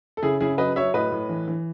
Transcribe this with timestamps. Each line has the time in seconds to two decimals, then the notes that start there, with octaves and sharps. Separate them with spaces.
0.17 A4
0.22 C#3 E4 G#4
0.41 C#3 E4 G#4
0.58 F#3 B4 D#5
0.76 F#3 C#5 E5
0.94 A2 B4 D#5
1.12 A2
1.29 E3
1.48 E3